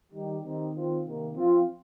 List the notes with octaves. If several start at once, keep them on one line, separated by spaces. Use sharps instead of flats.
D#3 G3 D#4 G4
D#3 C4 D#4 G4
D#3 C4 F4
C3 D#3 A#3
F3 C4 F4